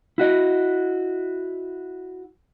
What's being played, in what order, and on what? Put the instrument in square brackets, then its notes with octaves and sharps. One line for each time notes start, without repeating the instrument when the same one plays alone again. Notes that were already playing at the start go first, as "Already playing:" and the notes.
[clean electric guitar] E4 F#4 D#5